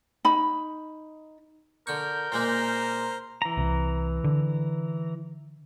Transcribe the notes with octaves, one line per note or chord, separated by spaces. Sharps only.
D#4 B5
D3 A#4 C#6 G6
A#2 G#3 A#3 C5 A#5
E3 A#5
C2
D3